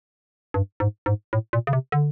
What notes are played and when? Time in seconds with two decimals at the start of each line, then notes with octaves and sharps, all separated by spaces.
0.54 G2
0.80 G#2
1.06 G#2
1.33 A2
1.53 A#2
1.67 C#3
1.73 C3
1.92 D3